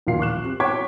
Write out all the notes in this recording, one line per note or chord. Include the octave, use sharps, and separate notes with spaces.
D#1 A#1 A#2 F5 C7
C#6 D6 F#6 E7
C4 G4
C#5 G5 C#6 D6 G#6 B6